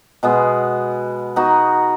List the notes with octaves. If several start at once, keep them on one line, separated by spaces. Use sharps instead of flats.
B2 G#3 B3
B3 D#4 F#4